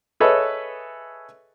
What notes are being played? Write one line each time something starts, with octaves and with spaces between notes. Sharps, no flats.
G#4 A4 B4 C#5 D#5 E5